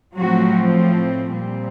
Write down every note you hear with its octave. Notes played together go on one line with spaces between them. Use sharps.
A2 F3 F#3 A3 C4 F#4
A#2 G3 C4